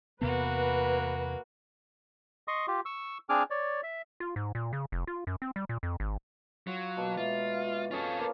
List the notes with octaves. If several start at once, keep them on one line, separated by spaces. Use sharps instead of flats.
E2 C3 A#3 B3 F#4 B4
D#5 C6 C#6 D#6
F4 G4
C#6 E6
C4 D4 G#4 G#5 D6 F6
C#5 D5
E5
F4
G#2
A#2
C#3
F1
F4
F#2
C4
G3
A#2
F2
G#1
F#3 F4 C#5
B2 A#3 A5
G#3 F4 B4 E5
C#4 F4 G#4 A4 F5
F3 A#3 A#4 B4 C#5